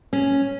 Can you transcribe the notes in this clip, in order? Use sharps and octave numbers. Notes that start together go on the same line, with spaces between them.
C#4